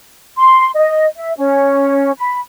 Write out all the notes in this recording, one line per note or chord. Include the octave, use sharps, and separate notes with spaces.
C6
D#5
E5
C#4
B5